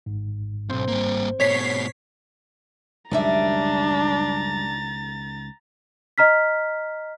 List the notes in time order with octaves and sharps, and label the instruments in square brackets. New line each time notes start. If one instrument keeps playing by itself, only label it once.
[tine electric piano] G#1 G#2
[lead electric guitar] B1 G2 [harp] C4
[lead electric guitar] G3 A#3
[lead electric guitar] G#2 B2 [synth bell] C#5 B6 C7
[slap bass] C#2 D#3 [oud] F#2 G3 E5 [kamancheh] D4 [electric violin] A#5 A6
[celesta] D#5 A#5 F6 B6